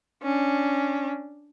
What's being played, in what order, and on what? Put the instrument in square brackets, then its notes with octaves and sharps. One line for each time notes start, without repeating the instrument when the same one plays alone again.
[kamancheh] C#4 D4